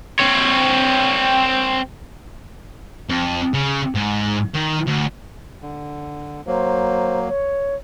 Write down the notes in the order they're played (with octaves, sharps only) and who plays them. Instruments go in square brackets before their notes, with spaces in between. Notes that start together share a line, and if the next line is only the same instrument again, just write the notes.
[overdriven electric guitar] C4 C#5
[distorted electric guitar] F2
C#3
G#2
D#3
D2
[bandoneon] D3
[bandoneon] F#3 A#3 [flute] C5
[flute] C#5